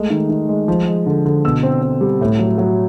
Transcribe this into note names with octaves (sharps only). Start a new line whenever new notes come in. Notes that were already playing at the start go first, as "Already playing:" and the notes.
Already playing: G#3 A3
D#3
D#3
G#3
F3
G#3
D3
D3
B2 E6
C4
C4
G3
A2
F#3
F#3